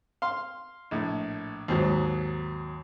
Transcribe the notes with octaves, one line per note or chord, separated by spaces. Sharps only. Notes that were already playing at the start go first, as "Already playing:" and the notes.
F5 C6
A#1 A2
D#2 G#2 F#3